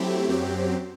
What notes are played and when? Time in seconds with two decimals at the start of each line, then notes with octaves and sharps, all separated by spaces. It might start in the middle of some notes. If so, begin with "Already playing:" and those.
Already playing: F#3 A3 C4 E4 G4
0.28 F#2 F#3 C4 G4